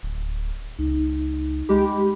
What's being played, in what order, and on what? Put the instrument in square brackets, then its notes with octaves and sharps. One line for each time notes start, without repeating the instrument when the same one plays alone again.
[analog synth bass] D1
[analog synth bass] C#2 [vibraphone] D#4
[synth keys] G#3 G4 [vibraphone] B5